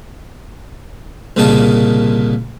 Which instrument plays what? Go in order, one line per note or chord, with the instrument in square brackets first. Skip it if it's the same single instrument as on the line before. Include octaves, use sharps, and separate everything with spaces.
[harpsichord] C2 A#2 C#3 A#3 D#4 A5